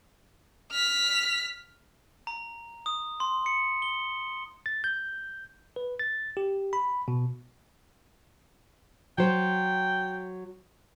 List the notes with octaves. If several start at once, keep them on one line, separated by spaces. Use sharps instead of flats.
F6 B6
A#5
D#6
C6
C#7
G7
A6
G6
B4
A6
G4
B5
B2
F#3 C5 G5